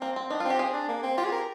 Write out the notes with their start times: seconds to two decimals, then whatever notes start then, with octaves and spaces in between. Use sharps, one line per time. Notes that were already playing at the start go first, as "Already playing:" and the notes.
0.01 A#3 C4
0.16 C4
0.30 D4 D#4
0.40 F4
0.45 C4
0.50 G4
0.59 C4 G#4
0.74 D4
0.89 A#3
1.03 C4
1.17 F4 G4
1.25 G#4
1.32 A#4